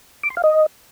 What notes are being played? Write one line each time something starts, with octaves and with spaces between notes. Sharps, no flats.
D6
C6
F5
D#5